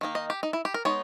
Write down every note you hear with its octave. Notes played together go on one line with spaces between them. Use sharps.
D#3 A#3 D#4
D#5
G4
D#4
E4
G4
A#4
G#3 B3 D#4 C#5